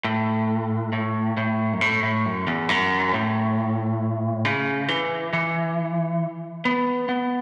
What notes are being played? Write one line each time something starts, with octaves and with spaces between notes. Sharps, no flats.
A2
A2
A2
F#2
A2
A2
F#2
E2
F#2
A2
C#3
E3
E3
B3
B3